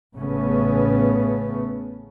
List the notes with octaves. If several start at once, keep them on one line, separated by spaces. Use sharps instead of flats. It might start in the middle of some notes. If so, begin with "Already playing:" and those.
A1 C#3 A3 B3 C#4